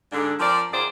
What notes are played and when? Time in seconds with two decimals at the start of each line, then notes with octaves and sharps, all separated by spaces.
0.12 G#2 D3 D4
0.40 F3 C4 A#4 D5
0.72 F#2 D#3 F4 G#4 C5 D5